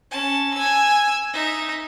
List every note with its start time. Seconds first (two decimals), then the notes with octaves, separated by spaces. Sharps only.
0.11 C#4 A5
0.54 G#5 E6
1.33 D#4 E5